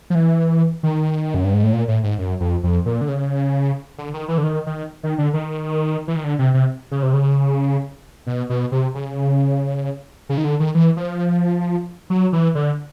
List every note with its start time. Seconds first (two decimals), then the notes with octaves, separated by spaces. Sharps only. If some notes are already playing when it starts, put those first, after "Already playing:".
0.10 F3
0.15 E3
0.83 D#3
1.34 F#2
1.44 G2
1.54 G#2
1.63 A2
1.73 A#2
1.88 A2
2.03 G#2
2.18 F#2
2.40 F2
2.63 F2
2.86 A#2
3.01 D3
3.08 C#3
3.98 D3
4.14 D#3
4.28 E3
4.38 D3
4.43 D#3
4.66 D#3
5.03 D#3
5.18 D3
5.34 D#3
6.08 E3
6.16 D#3
6.24 D3
6.39 C3
6.54 C3
6.91 C#3
7.03 C3
7.13 C#3
8.27 B2
8.50 B2
8.72 C3
8.95 C#3
10.29 C#3
10.38 D#3
10.44 D3
10.60 D#3
10.75 E3
10.97 F3
12.10 F#3
12.33 E3
12.55 D3